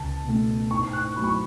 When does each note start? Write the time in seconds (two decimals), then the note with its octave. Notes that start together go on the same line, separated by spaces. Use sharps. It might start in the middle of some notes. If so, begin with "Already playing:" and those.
Already playing: C#2 A5
0.24 B2 A3
0.70 G#2 C#6
0.93 F#6
1.16 F#3 A3 B5
1.24 C#6